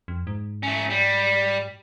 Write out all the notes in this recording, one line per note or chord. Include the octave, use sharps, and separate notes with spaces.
F2
G#2
A3 C#4
G3